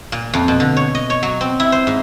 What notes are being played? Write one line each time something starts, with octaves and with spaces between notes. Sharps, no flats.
A#2
F2
B2
D3
C#5
D#5
C#5
F#3
C4
E4
C5
G#2